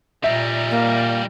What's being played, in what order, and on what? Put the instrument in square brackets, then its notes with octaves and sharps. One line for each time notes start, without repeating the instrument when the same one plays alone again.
[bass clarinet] A#2 [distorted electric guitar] G3 D#4 [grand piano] E5
[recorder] A#3